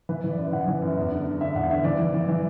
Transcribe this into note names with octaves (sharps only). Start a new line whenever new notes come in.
E3 B4
E3
D5
F#2
E3 F#5
E3
F#2
E2
D3
D3
D3 E5
E2 F#5
D3 E5
E3 D5
E3
E3
E3